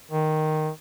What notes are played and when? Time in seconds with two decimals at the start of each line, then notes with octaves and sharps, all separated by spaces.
0.11 D#3